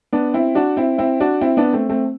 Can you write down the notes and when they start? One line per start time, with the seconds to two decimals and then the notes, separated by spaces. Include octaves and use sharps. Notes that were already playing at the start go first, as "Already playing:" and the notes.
0.13 B3 D4
0.34 C4 E4
0.55 D4 F#4
0.77 C4 E4
0.98 C4 E4
1.20 D4 F#4
1.41 C4 E4
1.57 B3 D4
1.73 A3 C4
1.90 A3 C4